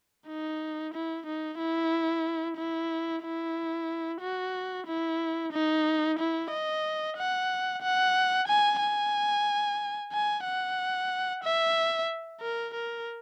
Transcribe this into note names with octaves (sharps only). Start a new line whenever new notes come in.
D#4
E4
D#4
E4
E4
E4
F#4
E4
D#4
E4
D#5
F#5
F#5
G#5
G#5
G#5
F#5
E5
A#4
A#4